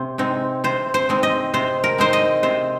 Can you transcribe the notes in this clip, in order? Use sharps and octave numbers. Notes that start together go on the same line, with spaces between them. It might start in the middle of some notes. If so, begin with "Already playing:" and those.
Already playing: C3 C5
G#3 C4 D#4
C3 C5
C5
G#3 C4 D#4
D#5
C3 C5
A#4
G#3 C4 D#4 C5
D#5
C3 C5